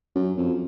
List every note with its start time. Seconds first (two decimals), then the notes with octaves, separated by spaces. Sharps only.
0.15 F#2
0.37 F2